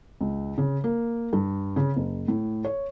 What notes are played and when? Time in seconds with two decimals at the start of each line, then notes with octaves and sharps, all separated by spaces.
0.21 C#2
0.58 C#3
0.84 A#3
1.33 G2
1.76 C#3
1.96 F#1
2.28 A2
2.65 C#5